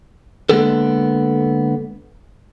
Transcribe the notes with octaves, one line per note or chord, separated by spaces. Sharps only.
D3 G#3 A#3 B3 G#4 A4